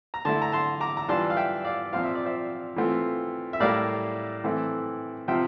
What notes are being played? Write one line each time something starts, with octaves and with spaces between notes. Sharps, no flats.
A#5
D3 A3 E4 A5 C6
A#5
A5 C6
A#5 D6
A#5
E3 G3 D4 F4 A5 C6
F5
E5 G5
D5 F5
A#2 F3 C4 F4 F5
E5
D5
C5 E5
E3 A3 C4 F4
E5
A2 G3 A#3 E4 D5 F5
E3 A3 C4 E4
C3 F3 C4 F4 E5 G5